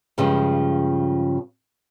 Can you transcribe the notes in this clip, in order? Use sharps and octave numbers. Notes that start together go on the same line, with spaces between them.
G2 C#3 F3 G#3